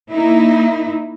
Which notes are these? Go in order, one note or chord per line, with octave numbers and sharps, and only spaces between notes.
A#3 D#4 E4